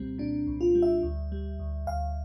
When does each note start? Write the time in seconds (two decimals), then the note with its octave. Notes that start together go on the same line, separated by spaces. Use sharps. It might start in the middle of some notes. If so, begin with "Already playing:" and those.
Already playing: C2 A#2 G3 C4
0.18 A#2 D4
0.47 C2
0.61 F4
0.75 G3
0.82 E5
1.03 D2
1.32 G3
1.59 D2
1.87 D2 F5